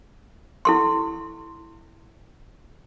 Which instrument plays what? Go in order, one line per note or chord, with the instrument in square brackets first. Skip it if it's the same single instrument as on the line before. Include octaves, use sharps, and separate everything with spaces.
[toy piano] E4 A4 C6